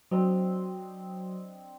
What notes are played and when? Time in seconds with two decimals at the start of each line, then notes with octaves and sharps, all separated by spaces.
0.11 F#3 C4 D4 D#5